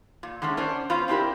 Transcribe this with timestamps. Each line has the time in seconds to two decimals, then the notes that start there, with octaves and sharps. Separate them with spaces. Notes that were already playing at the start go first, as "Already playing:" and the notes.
0.23 A#2
0.42 D3 G#3 A3 C#4
0.57 C#4 D4 C5
0.90 B3 C#4 F4 C5 F5
1.08 C4 D4 E4 F#4 G4 A#4